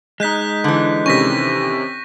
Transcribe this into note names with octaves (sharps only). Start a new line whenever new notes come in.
G#3 D#4 F#6 G6 B6
D3 E3
C3 D#3 C#4 C#6 A#6 B6